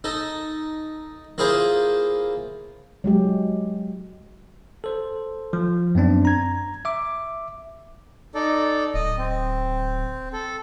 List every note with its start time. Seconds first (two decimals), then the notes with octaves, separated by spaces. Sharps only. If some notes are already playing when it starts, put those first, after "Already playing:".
0.04 D#4 A4
1.38 A#3 E4 F4 G#4 C5
3.04 F#3 G#3 G4
4.84 A4 C5
5.53 F3
5.95 F#2 B3 C4 D4
6.25 A#5 G#6
6.85 E5 D6
8.35 D#4 A4 D5
8.94 D1 D#5
9.18 C4
10.33 A4